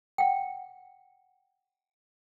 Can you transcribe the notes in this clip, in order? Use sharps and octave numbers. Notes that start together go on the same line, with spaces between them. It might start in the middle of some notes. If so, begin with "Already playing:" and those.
F#5 G5